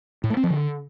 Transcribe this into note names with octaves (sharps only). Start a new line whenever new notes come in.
A2
A3
C4
F3
D3